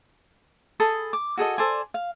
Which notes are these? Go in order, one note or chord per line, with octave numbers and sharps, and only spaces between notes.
G#4 A4 B5 D#6
D6
F#4 G#4 A4 D#5
A4 C5 D5 G#5
F5